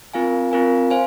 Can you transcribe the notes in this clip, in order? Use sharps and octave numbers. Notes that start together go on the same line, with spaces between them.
C4 F4 A#4 F5 G#5
C4 F4 A#4 F5 G#5
C5 F5 G#5